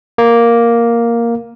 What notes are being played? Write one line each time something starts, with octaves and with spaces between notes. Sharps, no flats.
A#3